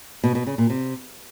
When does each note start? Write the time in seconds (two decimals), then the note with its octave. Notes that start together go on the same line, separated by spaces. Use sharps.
0.24 B2
0.35 B2
0.47 C#3
0.58 A#2
0.70 C3